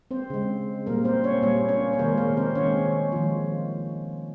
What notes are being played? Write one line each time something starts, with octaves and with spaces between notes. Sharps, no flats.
C4 C5
C#3 G#3
A#2 G3 A#3 A#4
C4 C5
C#4 C#5
A#2 G3 A#3 C#5
C#4 C#5
C5
C3 D#3 G#3 A#3 A#4
A#3 A#4
C4 C5
D#3 G#3 C#4 C#5
D#3 F3 G#3 F4